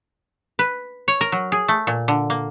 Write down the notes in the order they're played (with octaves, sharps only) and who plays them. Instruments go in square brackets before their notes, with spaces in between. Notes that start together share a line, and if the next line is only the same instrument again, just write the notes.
[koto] B4
C#5
A#4
F#3
G#4
A3
A#2
D3
A#3